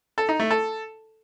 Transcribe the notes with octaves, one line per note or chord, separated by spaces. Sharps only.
A4
D#4
A3
A4